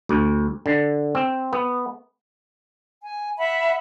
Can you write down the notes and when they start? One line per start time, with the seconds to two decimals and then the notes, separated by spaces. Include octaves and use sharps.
0.09 D2
0.66 D3
1.15 C4
1.53 B3
3.03 G#5
3.38 E5 F#5 B5